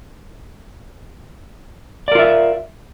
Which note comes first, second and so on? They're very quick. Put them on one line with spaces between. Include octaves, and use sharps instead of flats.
D5 A#4 F4 E5